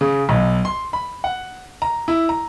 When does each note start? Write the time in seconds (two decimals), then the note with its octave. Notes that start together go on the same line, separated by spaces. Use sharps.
0.01 C#3
0.29 B1
0.65 C6
0.93 B5
1.24 F#5
1.82 A#5
2.08 E4
2.29 A#5